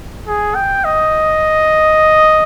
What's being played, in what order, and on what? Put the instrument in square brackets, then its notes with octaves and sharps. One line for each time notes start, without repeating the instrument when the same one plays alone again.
[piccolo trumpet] G#4
G5
D#5